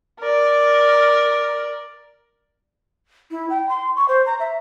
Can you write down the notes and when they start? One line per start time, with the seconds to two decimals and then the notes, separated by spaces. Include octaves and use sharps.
0.20 A#4 D5
3.31 E4
3.50 G5
3.69 C6
3.96 C#6
4.08 C5
4.26 A#5
4.40 E5